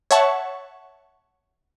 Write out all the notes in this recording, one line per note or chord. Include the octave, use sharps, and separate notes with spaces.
C#5 E5 F#5 A5 C#6